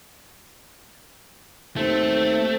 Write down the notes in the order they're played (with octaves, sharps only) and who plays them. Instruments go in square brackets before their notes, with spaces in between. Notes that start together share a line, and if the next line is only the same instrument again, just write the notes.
[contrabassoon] D#2 [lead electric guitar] A3 [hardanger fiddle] C4